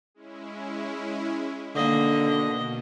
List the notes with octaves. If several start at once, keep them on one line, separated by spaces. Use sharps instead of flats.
G#3 C#4 E4
B2 D3 D#3 A#3 D#5